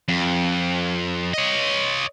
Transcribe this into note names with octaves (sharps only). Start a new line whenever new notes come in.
F2
C#5 D#5